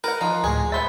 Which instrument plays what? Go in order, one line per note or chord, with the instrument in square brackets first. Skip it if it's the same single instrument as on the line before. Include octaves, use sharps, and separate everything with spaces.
[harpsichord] A#4 [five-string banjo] B4 F#5
[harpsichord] F3 [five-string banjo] D#4
[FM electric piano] D2 A2 [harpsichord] G#3 [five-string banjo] G#4
[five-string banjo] B3 C5 E5 [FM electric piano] B5 A6